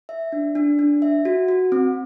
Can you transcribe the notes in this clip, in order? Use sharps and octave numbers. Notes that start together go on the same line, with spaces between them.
E5
D4
D4
D4
E5
F#4
F#4
C4